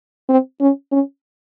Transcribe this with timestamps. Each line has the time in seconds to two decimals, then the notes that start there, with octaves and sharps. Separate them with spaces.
0.29 C4
0.61 C#4
0.92 C#4